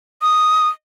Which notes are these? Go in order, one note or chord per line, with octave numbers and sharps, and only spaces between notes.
D#6